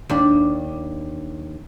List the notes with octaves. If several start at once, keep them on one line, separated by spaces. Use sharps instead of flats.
D#2 D4